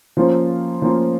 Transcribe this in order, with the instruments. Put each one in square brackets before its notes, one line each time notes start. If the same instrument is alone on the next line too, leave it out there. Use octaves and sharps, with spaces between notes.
[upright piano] F3 A#3 C#4 F4 C5
F3 A#3 C#4 F4 C5